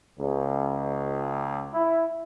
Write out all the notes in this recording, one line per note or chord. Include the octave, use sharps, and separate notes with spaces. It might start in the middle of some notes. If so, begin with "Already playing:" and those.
C#2
E4